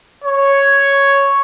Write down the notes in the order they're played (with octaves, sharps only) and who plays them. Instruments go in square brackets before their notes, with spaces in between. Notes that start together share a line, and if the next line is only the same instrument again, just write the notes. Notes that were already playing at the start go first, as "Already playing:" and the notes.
[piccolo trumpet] C#5